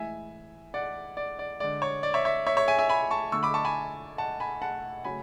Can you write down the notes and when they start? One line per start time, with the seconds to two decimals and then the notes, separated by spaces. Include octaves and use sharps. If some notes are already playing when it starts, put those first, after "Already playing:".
Already playing: A2 E3 G#3 E5 G#5
0.74 D5 F#5
1.17 D5
1.39 D5
1.60 D3 G#3 D5
1.82 C#5
2.03 D5
2.14 C#5 E5
2.25 C#5 E5
2.46 C#5 E5
2.57 C#5 E5
2.68 E5 G#5
2.79 E5 G#5
2.89 G#5 B5
3.11 A5 C#6
3.32 D3 A3 C#6 E6
3.43 B5 D6
3.54 A5 C#6
3.65 G#5 B5
4.18 F#5 A5
4.40 G#5 B5
4.62 F#5 A5
5.04 C#3 F#3 A3 G#5 B5